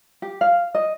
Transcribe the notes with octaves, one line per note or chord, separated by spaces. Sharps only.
G4
F5
D#5